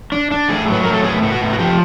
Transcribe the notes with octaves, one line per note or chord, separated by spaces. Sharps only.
D4
D4
A2 G#4
F#3 B4
A2 A#4
A4
B3 G#4
B3
F#4
A2
F#4
F3 G4